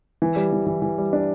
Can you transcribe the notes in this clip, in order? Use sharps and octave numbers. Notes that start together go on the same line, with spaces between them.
E3
G3
E3
E3
E3
G3
D4